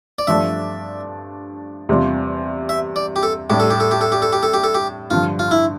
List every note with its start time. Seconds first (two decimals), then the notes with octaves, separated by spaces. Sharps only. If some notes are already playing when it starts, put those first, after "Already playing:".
0.19 D5
0.27 G2 F3 A3 D4 E5
1.89 E2 C3 G3 D4 F4
2.69 E5
2.96 D5
3.16 G4
3.23 A4
3.50 A2 G3 D4 G4
3.60 A4
3.70 G4
3.80 A4
3.91 G4
4.01 A4
4.12 G4
4.22 A4
4.33 G4
4.43 A4
4.54 G4
4.64 A4
4.75 G4
5.10 G2 D3 F3 F4
5.39 F4
5.51 E4